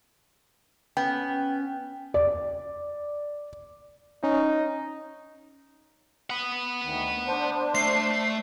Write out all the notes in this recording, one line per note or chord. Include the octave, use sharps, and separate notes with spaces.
B3 C#4 G5
D5
C#4 D#4
F#5 B5
D2 D#3
D4 C5
A3 C7